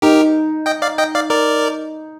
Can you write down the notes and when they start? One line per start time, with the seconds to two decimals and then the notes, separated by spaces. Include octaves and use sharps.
0.02 D#4 G4 A#4
0.66 D#5 G5
0.82 D5 F5
0.98 D#5 G5
1.15 D5 F5
1.30 A#4 D5